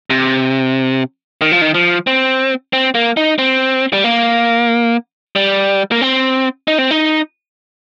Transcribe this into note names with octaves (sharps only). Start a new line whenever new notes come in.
C3
D#3
F3
D#3
F3
C4
C4
A#3
D#4
C4
G3
A#3
G3
A#3
C4
D#4
C4
D#4